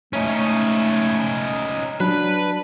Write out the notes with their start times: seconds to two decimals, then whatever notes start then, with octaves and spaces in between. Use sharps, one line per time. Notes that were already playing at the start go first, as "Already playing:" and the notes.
0.13 A3 C#4 D#4 C#5
2.00 F#3 D4 B4